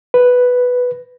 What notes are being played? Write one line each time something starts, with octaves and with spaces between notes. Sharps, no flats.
B4